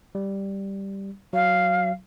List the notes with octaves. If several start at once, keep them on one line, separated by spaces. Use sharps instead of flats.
G3
F#3 F5